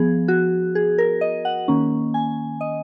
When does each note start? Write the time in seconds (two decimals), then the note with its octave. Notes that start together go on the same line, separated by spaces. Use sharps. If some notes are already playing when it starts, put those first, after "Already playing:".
Already playing: F3 B3 G#4
0.28 F#4
0.75 G#4
0.98 A#4
1.21 D#5
1.45 F#5
1.68 D#3 A#3 C#4
2.14 G#5
2.61 D#5